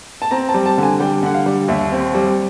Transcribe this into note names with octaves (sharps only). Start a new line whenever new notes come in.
A5
C4 A#5
A5
G3
A5
D3
G#5
G3 G5
D3 F#5
F5
G3
D#2 E5
C4
G3